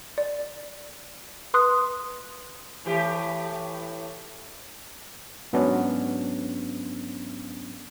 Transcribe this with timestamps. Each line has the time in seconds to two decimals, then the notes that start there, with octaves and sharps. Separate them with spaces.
0.18 D5
1.54 B4 C6 D#6 F#6
2.85 A2 E3 G4
5.53 G#2 F#3 B3 C#4 D4